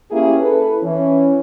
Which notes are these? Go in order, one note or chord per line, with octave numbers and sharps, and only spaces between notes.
A#3 C#4 E4 G4 G#4
E4 A4 B4
E3 C#4